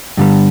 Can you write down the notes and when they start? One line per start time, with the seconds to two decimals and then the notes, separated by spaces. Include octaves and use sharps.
0.17 G2 D3 G3